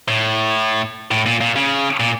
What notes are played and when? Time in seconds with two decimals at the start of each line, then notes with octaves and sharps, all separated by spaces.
0.08 A2
1.11 A2
1.26 A#2
1.41 A#2
1.56 C#3
2.00 A#2